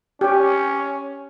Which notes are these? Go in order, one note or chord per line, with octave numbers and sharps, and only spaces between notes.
C#4 G4